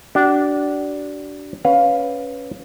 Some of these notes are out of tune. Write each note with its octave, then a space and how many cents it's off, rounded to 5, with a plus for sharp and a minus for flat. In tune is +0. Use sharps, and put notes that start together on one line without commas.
D4 -10 F#4 +45
C#4 +0 B4 +0 F5 +10